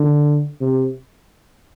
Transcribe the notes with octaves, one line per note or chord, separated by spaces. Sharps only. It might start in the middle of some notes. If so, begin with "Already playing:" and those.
Already playing: D3
C3